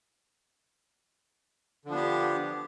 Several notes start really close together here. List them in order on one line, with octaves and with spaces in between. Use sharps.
D3 F3 D4 B3 G4